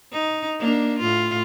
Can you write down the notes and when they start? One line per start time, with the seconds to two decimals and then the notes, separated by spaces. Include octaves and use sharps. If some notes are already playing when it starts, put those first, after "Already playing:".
0.12 D#4
0.59 A#3 D4
1.00 A2 F4